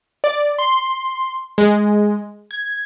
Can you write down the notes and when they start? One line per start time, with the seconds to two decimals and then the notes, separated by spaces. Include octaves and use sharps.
0.24 D5
0.58 C6
1.58 G#3
2.51 G#6